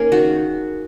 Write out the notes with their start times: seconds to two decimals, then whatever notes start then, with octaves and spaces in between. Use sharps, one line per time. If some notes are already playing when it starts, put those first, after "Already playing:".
Already playing: A#3 C#4 D#4 G#4 A#4
0.12 D#3 F#4